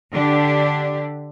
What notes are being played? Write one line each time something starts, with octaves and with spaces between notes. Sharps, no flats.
D3 D4 G4